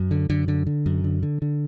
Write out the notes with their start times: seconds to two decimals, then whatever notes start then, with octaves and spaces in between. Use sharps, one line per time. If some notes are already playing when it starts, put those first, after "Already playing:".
Already playing: F#2
0.11 D3
0.30 F#2 D3
0.48 D3
0.67 D3
0.86 F#2
1.04 D3
1.23 D3
1.42 D3